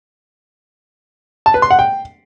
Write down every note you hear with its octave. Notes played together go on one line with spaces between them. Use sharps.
A5
B4
C6
F#5
G5